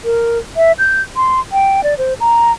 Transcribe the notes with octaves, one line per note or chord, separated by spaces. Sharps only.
A#4
E5
G6
C6
G5
D5
C5
A#5